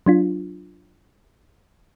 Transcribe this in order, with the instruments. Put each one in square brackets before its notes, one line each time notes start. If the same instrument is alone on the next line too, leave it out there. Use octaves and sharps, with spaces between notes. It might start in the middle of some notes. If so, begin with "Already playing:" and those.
[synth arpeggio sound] F#3 D4 F4